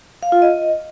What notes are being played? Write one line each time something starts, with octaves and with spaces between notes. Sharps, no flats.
F5
F4
D#5